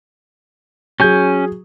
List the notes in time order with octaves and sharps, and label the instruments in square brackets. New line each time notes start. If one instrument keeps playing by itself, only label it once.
[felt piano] F#3 G#4 [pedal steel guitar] C#4 G#5 G6